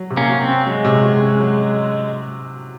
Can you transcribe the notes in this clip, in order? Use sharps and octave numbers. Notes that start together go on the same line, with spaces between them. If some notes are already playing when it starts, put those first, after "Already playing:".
Already playing: F#3
C3
A#3 C#4
F#4
C4
C#4
F#3 G#3
C3
F#4
C#4
F#3